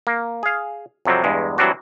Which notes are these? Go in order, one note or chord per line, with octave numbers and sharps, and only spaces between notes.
A#3
G#4 F5
F2 C3 F#3 G3 C4
E2 G2 G#3
E3 F#3 G3 C4 D4 F#4